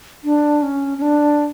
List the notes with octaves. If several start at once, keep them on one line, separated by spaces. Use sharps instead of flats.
D4
C#4
C#4
D4